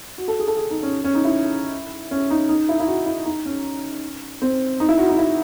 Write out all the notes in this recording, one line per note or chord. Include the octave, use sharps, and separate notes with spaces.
F#4
A4
G#4
A4
G#4
D#4
C#4
C#4
D#4
E4
C#4
D#4
D#4
E4
E4
F#4
E4
D#4
C#4
C4
D#4
E4
F#4
D#4
E4